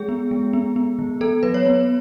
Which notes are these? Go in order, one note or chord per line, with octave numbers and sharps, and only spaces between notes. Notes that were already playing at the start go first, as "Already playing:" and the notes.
Already playing: G#3 G#4
B3
G#3
B3
B3
E3
B3 A4
F#3 B4
C#5
B3